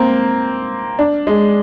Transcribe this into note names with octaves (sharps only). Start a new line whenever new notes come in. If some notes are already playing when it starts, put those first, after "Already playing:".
Already playing: A#3 C4
D4
G#3